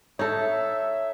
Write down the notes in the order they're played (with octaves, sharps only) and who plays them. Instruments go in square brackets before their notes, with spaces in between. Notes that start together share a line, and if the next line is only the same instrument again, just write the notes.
[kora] D#4 A4 [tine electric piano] C#5 [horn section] E5